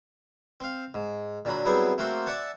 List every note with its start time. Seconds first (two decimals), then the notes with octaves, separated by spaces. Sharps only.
0.60 C4 F5
0.94 G#2
1.45 A#2 D3 F#3 B5
1.65 F#3 G3 B3 C4 E4 G#4
1.98 A3 A#3 C4 F#4 C5
2.26 D5 E5 F#5 G#5 A5